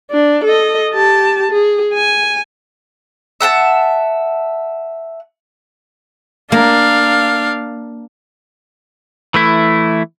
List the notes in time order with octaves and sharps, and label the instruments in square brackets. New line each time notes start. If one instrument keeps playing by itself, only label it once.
[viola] D4
A4 D#5
G4 A5
G#4
G#5
[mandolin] E5 F#5 G5 A5
[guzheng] A#3 [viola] D4 F5
[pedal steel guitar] E3 A3 E4